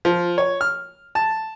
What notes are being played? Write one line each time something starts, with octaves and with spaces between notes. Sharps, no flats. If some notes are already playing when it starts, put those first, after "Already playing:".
F3
C#5
F6
A5